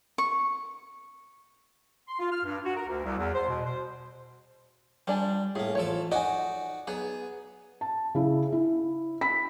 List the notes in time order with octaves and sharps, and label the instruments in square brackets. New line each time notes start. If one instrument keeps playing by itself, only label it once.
[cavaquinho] C#6
[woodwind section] C6
F4
F6
G2
F#4
A#4
D2
C2
E2
C5
B2
C5
[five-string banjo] F3 D4 G#5 [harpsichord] G3
[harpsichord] A2 A#3 [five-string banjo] G#4
[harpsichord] A1 F3 A4 [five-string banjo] C#5
[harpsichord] D#4 F#4 D5 [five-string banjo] D#5 G#5
[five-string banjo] F#3 B3 [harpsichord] G#4
[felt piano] A5
C#3 E4
E4
B5 B6